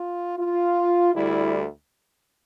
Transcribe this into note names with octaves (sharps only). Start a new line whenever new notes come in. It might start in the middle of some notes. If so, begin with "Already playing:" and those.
Already playing: F4
F4
D2 D3 G3 E4